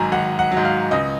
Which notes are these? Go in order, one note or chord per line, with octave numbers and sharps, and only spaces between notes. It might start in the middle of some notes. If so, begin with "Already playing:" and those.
Already playing: G#1 G#2 F#3 G#5 A#5
G#1 F#5
F#5
F#3
G#2
F5
C#2 D#5